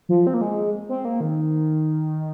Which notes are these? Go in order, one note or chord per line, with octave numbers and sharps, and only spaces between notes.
F3
C4
A#3
G#3
C4
A#3
D#3